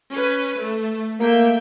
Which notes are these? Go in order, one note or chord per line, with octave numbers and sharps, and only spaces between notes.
C#4 B4
A3
A3 A#3 E5 G5